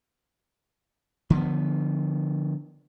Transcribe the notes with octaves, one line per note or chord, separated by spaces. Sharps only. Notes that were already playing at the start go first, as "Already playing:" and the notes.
D3 F3 A#3 B3